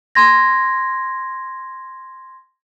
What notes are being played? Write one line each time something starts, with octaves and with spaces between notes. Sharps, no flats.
C6 G#6 A#6